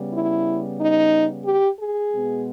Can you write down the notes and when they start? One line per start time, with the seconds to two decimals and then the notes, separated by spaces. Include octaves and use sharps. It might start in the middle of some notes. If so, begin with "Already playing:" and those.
Already playing: C#3 G3 B3
0.13 E4
0.79 D#4
1.46 G4
1.79 G#4
2.12 B2 G#3 B3